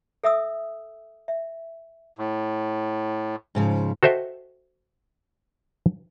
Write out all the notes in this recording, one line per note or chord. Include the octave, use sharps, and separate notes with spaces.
A4 E5 D#6 E6
E5
A2
G#2 C#3 F3
F#4 A4 C5 D#5 E5 G5